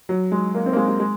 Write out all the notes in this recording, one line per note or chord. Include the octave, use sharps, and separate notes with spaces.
F#3
G#3
A#3
C4
A#3
G#3
G#3
G#3